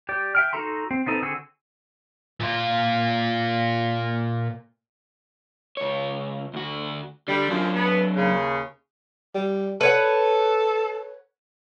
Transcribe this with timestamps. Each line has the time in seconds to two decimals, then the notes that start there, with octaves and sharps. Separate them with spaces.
0.09 G4 D5
0.35 E5 G5 F6
0.53 D#4 F#4 A4 A#5 C6
0.91 C4
1.06 B3 C4 D#4 A4
1.22 D3 C4 F#4 G#4 E6
2.41 A#2 F4
5.77 C#2 C#5
6.54 D2 F#4
7.28 D3 G3
7.50 F#2 F3 F#3 D4
7.75 B3
8.16 D#2 C#3
9.35 G3
9.81 A4 B4 C#5 F#5